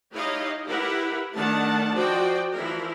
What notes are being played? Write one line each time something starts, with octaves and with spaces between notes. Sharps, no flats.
D#4 E4 G4 C#5 D#5 F5
E4 G4 A#4 B4 F#5
D#3 A3 D4 F#5 A5
F3 F#4 C5 D5 D#5 G5
E3 F3 E4 A#4